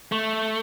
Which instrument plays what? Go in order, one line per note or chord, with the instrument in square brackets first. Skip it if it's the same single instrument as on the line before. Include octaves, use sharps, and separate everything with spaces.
[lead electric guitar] A3